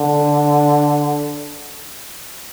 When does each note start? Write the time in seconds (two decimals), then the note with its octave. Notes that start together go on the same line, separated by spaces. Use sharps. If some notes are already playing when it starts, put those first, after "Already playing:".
Already playing: D3